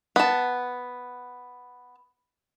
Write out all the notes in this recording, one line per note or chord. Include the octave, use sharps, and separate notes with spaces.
B3 A5